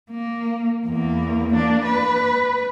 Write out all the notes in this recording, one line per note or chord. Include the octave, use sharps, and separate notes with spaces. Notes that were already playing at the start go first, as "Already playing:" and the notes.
A#3
E2 A#3
A#3 D4
B4